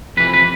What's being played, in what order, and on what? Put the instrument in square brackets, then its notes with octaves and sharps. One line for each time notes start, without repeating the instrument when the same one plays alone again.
[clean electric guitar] F2 C3 E3 B4
B4